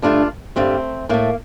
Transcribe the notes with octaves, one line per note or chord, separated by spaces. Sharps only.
G2 D3 A3 D4 F4
G2 D3 G3 A3 C4
A2 A3 A#3